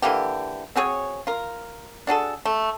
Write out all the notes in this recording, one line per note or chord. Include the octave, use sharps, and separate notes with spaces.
D3 E3 A#3 G4
C4 F#4 G#4 C#5
F4 A#4
D4 F#4 G#4 A4
A3